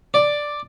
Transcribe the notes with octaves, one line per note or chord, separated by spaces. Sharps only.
D5